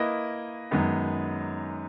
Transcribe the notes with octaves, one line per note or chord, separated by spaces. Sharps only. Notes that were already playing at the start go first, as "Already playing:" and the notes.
Already playing: A#3 E4 B4 D#5
F#2 D#3 G#3 B3 D#4